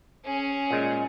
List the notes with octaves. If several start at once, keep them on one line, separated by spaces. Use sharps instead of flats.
C#4 G#4
A#2 G#3